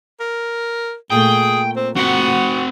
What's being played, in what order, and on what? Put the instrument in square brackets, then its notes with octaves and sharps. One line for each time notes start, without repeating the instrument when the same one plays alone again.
[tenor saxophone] A#4
[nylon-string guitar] A#2 A3 [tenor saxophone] G#4 [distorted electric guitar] G5
[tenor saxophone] C4
[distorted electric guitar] C4 F#5 [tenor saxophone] F#4